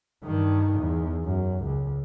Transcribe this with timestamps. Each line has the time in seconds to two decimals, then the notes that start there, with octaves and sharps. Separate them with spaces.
0.24 G2 D#3
0.80 E2
1.25 F#2
1.64 C#2